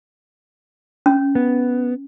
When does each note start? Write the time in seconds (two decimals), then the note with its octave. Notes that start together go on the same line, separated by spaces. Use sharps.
1.06 C#4
1.35 B3